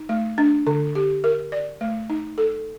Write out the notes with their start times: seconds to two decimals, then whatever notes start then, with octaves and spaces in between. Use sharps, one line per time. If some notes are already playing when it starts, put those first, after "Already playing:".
Already playing: D#4
0.09 A3
0.38 D4
0.67 D3
0.95 G4
1.24 A#4
1.52 D5
1.81 A3
2.10 D#4
2.38 A4